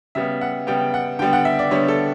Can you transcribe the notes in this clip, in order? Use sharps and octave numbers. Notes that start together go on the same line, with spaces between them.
C#3 G3 B3 E5
F#5
C#3 G3 B3 G5
F#5
D3 G3 B3 G5
F#5
E5
D5
D3 G3 B3 C#5
A4